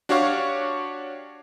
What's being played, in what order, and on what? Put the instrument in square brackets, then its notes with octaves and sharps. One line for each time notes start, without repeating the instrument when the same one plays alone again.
[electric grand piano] D4 F#4 G4 C#5 F5 C#6